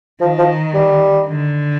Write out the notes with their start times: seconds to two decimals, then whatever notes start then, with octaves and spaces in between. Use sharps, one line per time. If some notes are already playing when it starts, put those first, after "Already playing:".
0.21 D#3 F3
0.38 F3
0.74 G3
1.27 D3